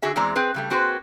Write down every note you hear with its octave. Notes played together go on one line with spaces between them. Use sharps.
D3 F#4 G#4 E5
E2 E3 G#3 C4 D5 A#5
C4 G#4 B4
C#3 G3 A3
A#3 C4 F#4 G#4 B4 C5